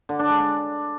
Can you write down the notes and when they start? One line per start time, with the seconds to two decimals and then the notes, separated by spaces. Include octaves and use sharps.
0.09 D3
0.19 D4
0.30 G#3
0.40 D4